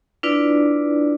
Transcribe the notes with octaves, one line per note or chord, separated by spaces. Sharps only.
D4 E4 F4 B4 D5